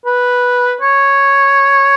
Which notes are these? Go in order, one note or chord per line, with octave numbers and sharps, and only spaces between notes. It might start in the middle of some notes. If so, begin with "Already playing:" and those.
B4
C#5